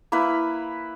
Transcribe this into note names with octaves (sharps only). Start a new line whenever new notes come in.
A#3 E4 B4